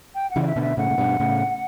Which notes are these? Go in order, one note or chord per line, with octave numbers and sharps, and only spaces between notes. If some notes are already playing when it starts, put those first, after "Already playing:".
G5
F#5
C#3 E3
D5
E5
B2 D3
E5
A2 C#3 F#5
A2
G2 B2
A2 C#3